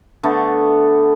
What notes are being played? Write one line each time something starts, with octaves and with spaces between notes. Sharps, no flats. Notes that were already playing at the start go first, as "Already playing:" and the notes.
D3 A3 B3